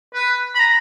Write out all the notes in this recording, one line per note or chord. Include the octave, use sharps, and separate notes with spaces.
B4
B5
A#5